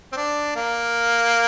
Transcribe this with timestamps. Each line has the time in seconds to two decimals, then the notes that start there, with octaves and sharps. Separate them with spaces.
0.12 C4
0.17 D4
0.56 A#3